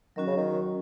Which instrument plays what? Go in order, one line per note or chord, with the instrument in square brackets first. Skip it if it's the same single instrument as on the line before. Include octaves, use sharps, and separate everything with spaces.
[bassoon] D#3 [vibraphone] F#3 C#4 F#4
[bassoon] C#3
D#3